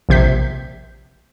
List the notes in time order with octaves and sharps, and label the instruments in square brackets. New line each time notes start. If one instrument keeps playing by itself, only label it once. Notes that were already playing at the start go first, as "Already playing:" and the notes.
[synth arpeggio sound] A#1 C3 G6 B6